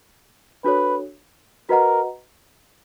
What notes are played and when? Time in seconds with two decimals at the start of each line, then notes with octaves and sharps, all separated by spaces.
0.64 D4 F#4 A4 B4 C#5
1.69 F#4 A#4 B4 D#5 F#5 A#5